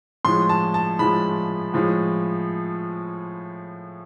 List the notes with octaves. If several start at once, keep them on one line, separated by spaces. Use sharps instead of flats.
A2 F3 G#3 C6
A5
A5
A2 F3 G#3 B5
A2 F3 G#3